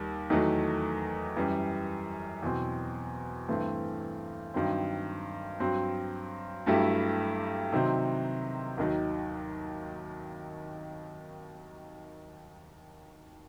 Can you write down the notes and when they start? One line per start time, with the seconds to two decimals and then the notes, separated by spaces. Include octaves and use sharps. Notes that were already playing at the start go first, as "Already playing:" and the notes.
Already playing: D#2 G3
0.30 E2 D#3 F#3 A3
1.37 F#2 E3 G3
2.43 E2 B2 F#3 C4
3.48 G2 E3 A3 C4
4.54 G2 D#3 F#3 C4
5.60 G2 F#3 C4
6.66 G2 F#3 A3 E4 G4
7.73 C3 D#3 F#3 C4
8.78 D#2 D#3 F#3